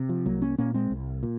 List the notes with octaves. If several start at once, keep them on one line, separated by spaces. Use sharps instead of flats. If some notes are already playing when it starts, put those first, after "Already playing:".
Already playing: C3
F3
C2 F#3 A#3
A#3 C#4
A#2 A#3 C#4
G#3 C4
C2
A#2